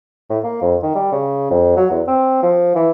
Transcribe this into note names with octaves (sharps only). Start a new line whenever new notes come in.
A2
A#3
F2
D#3
G3
C#3
F2
F#3
E2
C4
F3
E3